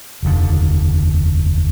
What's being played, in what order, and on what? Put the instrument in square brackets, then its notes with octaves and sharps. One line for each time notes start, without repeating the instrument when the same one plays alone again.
[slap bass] F1 D#2 D3